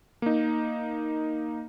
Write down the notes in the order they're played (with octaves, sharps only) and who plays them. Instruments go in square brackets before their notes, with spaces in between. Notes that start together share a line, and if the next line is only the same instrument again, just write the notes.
[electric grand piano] A#3 D#4